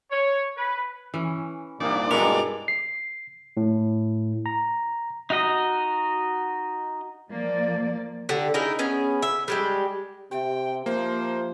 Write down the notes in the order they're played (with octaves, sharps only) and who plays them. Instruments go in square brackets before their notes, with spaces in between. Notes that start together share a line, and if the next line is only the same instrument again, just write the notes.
[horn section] C#5
B4
[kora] E3 C#4
[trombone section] C2 A#2 [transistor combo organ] D4 D5 [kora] D#4
[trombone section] G2 B2 G#3 [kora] E4 F#5 [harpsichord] A#4
[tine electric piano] C7
A2
A#5
[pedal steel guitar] D#4 F#4 D#5
[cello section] F3 A#3 D5
[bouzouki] D3 G4
D#4 E4 G#4 A#4
B3 C#4 G#4
E5
G3 G#3 G4
[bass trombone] C3 [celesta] G4 E5 [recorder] G5
[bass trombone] F3 [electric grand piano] A#3 [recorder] C5